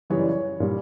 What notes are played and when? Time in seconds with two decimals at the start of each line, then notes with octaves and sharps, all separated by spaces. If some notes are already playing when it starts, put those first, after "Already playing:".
0.10 F#2 C#3 E3 G3 C#5
0.19 D5
0.29 C#5
0.60 A#2 G3